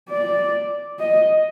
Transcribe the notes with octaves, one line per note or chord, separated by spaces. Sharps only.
D5
D#5